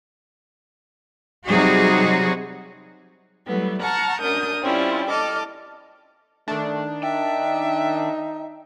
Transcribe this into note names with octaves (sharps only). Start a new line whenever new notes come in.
C3 F#3 G3 D#4 F#4 G#4
E3 F#3 G3 A3 B3
F#5 A5 A#5 C#6 F6
F#2 D4 A#4 D#6 G6
G3 C4 C#4 E4 F4
A4 D#5 D6 F6
D#3 A3 D4
D#4 E5 G5